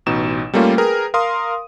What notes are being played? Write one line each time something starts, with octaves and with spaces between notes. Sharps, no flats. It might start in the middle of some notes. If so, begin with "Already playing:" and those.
A1 B2 D#4 E7
G3 A3 A#3 C#4 F4
G#4 A#4 B4 G5
A#4 F5 C6 D#6